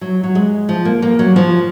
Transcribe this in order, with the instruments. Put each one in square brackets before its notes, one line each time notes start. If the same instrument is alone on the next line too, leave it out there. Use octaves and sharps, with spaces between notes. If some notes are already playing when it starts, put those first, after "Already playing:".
[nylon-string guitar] F#3
F#3
G#3
F3
A#3
A#3
F#3
F3